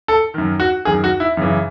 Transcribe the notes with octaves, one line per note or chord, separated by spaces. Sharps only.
A4
F#2 D#3
F#4
F#2 D#3 G#4
F#4
E4
F#2 C#3 E3